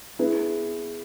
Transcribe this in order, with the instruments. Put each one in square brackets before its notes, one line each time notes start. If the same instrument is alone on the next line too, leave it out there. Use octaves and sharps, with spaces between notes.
[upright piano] B3 E4 G#4 B4